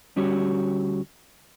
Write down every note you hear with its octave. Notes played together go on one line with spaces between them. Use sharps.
D2 G3 C#4 F#4 G4 C#5